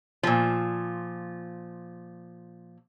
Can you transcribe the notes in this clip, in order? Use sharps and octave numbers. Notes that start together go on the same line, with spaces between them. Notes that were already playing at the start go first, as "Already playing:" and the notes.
A#2 F3